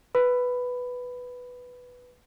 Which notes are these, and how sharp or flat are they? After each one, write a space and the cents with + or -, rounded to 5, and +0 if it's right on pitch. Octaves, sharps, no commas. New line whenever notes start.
B4 +0 B5 +10